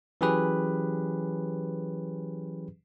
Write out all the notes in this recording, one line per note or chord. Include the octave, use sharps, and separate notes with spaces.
E3 F#3 C#4 G4 G#4 B4